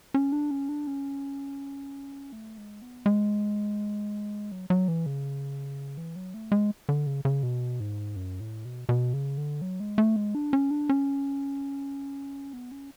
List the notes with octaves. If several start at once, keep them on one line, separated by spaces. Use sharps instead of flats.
C#4
D4
C#4
D4
C#4
A3
G#3
B3
G#3
F#3
F#3
E3
C#3
E3
F#3
A3
G#3
D3
C#3
C#3
B2
G#2
F#2
A2
B2
B2
C#3
D3
F#3
G#3
A3
G#3
D4
C#4
D4
C#4
B3
C#4